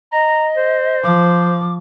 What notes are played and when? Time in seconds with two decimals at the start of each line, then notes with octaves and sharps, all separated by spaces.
0.12 D#5 A#5
0.57 C5
1.03 F3 D6